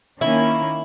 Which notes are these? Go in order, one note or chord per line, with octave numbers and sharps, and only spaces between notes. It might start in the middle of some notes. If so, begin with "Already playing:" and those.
D#3 A#3 C#4 E4